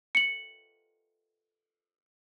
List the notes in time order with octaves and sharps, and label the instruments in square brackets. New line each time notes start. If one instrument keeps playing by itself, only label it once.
[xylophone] C#7 F#7